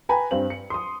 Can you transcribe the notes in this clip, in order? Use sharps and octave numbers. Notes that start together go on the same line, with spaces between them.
B4 G5 G#5 A#5 B5
G2 C4 C5 F#7
C#7
C6 D#6